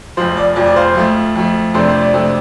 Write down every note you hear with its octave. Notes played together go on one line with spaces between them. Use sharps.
F1 F2 F3 C5
D5
F1 F2 F3 D5
D5
C5 F5
F2 F3 A3
F2 F3 A3
F2 C3 A3 D4 C5
C5
D5
F2 C3 A3 D4